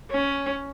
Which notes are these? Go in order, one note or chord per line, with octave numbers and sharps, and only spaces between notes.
C#4